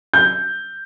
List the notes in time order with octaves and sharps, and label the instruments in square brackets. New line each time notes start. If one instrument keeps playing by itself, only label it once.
[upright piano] G6